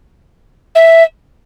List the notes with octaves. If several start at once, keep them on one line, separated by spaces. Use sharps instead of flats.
E5